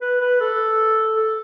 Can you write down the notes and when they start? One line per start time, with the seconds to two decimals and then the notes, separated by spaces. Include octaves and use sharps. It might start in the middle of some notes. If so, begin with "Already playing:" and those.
0.01 B4
0.21 B4
0.40 A4
1.16 A4